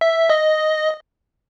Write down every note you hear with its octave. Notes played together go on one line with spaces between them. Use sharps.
E5
D#5